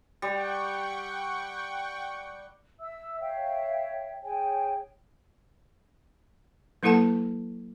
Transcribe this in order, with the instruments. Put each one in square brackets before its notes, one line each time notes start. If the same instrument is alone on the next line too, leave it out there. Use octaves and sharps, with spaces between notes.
[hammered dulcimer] G3 [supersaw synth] F#5 G5 C#6
[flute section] E5 E6
C#5 E5 F5 G5
G#4 C#5 G5 G#5
[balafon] F#3 A#3 E4 A4 F#5 A5